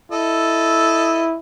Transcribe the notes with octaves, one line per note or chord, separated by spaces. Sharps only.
E4 A4 D#5